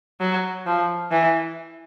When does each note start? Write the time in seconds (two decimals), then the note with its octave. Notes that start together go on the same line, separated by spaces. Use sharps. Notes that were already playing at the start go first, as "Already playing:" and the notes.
0.20 F#3
0.66 F3
1.11 E3